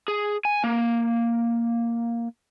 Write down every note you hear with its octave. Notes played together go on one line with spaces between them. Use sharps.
G#4
G#5
A#3